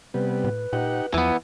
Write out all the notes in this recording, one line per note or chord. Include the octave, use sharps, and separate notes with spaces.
C3 G3 B3 B4
A2
A#2 D#4 G4 F#5
E2 E3 F3 B3